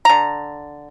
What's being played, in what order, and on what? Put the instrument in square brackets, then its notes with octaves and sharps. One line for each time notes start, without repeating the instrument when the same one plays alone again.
[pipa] D3 A#5